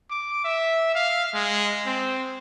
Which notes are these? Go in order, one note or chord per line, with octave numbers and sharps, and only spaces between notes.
D6
E5
F5
G#3
C4